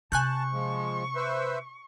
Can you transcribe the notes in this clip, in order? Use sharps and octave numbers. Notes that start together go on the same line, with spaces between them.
C3 G#5 A5 C#6 F#6 G6
F3 G#3
B4 C5 E5